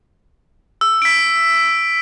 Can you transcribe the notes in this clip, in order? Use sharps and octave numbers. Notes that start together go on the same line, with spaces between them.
E6
B6 D7